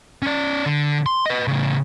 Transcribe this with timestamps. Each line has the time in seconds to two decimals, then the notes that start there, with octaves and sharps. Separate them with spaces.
0.22 C#4 D5
0.66 D3
1.06 C6
1.26 B4 D#5
1.48 A2 C#3